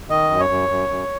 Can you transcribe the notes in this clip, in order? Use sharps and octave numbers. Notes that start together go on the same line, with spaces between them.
D#3 D#5
F#2
C#5
F#2
F#2
F#2